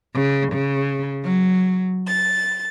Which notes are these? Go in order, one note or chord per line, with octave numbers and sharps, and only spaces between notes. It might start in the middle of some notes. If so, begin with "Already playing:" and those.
C#3
C#3
F#3
A6